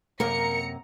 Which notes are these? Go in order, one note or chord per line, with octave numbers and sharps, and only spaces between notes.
F#2 C3 A#3 A#4 A#5 C#7